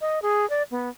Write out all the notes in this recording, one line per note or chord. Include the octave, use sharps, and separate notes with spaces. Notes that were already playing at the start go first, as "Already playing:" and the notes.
D#5
G#4
D5
B3